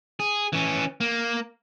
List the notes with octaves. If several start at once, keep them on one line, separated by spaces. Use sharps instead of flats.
G#4
E3 C#4
A#3